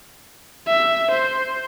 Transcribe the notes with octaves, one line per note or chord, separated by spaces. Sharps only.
E5
C5